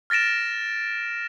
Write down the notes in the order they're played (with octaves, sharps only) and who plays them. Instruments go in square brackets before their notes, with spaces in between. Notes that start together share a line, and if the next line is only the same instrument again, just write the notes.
[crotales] F6 A6 A#6 D7 E7